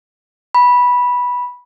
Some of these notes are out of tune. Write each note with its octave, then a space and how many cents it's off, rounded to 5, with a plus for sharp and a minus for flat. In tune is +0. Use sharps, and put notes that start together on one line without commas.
B5 -10